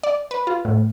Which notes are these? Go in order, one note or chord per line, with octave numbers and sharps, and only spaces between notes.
D5
B4
F4
A2